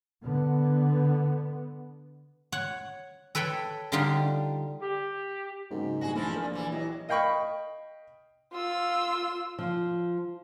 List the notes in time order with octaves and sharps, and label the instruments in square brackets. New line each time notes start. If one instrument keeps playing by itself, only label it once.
[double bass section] D3 B3
[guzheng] C#5 F#5
A4 B4 C#5 G5 B5
D3 G3 D4 D#4 F4 G4
[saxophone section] G4
[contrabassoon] G#2 [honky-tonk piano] C#3 F#3 A#3
[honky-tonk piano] G2 A#2 G3 [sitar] F#4 G#4
[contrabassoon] A#1 [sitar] E3 F3 E4 [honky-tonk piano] A3
[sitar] A#2 [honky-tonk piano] A#3
[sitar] A#2 E3
[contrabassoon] E3 [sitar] F#3 [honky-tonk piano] G4 D#5
[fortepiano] D#5 F5 G5 B5 C#6
[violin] F4 E6
[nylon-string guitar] F3